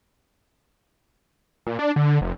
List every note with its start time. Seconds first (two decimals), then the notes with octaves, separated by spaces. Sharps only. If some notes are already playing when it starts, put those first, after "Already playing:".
1.67 A#2
1.79 D4
1.96 D3
2.21 F1